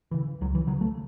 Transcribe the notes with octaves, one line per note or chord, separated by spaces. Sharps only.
C#3 E3
C#2 F#3
E3
C#3 F#3
A3